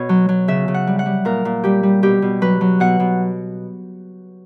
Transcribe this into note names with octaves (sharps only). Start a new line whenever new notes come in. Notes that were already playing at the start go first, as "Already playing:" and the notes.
Already playing: B2 C#5
F#3
F#3
C#3 E5
C#3
F#5
G3
F#5
G3
A#2 A#4
A#2
G3 G4
G3
B2 G4
B2
F#3 B4
F#3
B2 F#5
B2